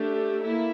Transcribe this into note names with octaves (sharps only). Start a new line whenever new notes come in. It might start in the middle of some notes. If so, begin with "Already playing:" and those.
Already playing: A3 D4 G4
A#3 E4 A4